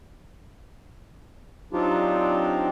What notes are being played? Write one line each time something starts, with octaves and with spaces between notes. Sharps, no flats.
F#3 C4 D4 D#4 F4 G4